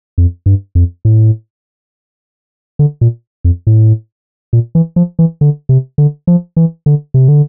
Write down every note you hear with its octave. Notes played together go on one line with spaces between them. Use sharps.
F2
G2
F2
A2
D3
A#2
F2
A2
A#2
E3
F3
E3
D3
C3
D3
F3
E3
D3
C3
D3